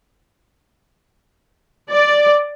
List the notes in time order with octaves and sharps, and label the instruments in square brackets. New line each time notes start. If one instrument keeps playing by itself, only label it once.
[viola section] D5